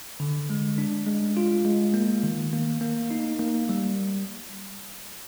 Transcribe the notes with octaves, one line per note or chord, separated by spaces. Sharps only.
D3
G#3
D4
G#3
F4
G#3
A#3
D#3
A#3
A#3
D#4
A#3
G3